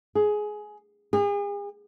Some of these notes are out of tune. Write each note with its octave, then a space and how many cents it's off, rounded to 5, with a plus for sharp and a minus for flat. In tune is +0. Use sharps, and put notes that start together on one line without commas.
G#4 +15
G#4 -40